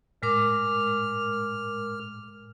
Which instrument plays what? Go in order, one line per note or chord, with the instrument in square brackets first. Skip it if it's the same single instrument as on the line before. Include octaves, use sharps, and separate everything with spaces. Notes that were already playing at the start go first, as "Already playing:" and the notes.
[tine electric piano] A2 [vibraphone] G#3 A#4 D6 [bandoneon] F6